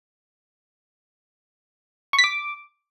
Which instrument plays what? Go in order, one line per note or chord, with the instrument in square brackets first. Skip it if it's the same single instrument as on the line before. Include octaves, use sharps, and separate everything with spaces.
[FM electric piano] C#6
B6
D6